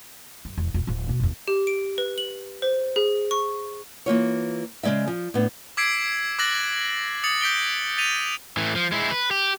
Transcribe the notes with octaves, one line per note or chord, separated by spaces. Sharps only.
F#2
E1
E1 F4
D1 F3
B2 A#3
F#1 E2
G4
D7
B4
F#7
C5
G#4
C#6
E3 A#3 F4 C#5
C#3 F3 G#3 D5 E5
F3
A2 B3 D4
D6 E6 G#6 B6 C7 D7
D6 E6 F#6 A6 A#6 F#7
D#6 A6 C#7 F#7
G6 B6 D7 G7
A6 B6 D#7 F7
A2 E3
F3
G#3 E4
B4
G4